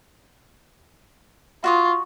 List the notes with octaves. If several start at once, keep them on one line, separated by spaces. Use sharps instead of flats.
F4 F#4 C#6 D#6